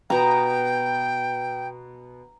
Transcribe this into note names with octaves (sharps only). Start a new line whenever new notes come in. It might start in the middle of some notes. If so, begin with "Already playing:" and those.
B2 B3 D#5 G5 A#5